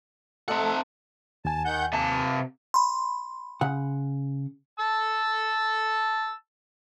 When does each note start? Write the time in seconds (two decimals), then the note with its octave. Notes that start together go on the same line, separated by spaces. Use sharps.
0.48 A3 C4 A4 D#5 E5 F#5 A#5
1.45 D#2 G#5 A5
1.65 D#3 F#5 G6
1.93 C3 A#3 A5
2.74 B5 C6
3.61 C#3 F#5
4.80 A5 E6